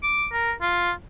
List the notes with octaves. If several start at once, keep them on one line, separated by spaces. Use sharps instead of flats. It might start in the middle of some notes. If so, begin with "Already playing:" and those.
D6
A#4
F4